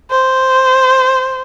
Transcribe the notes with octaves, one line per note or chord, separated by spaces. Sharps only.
C5